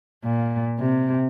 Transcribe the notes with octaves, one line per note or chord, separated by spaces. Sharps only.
A#2
C3